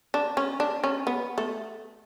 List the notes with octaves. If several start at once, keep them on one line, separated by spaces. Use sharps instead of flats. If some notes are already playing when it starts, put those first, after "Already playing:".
D4
C#4
D4
C#4
B3
A3